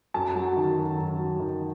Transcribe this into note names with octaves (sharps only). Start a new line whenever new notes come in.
F#2 A5
F#3
D#3
F#2
F#2
F#3
D#3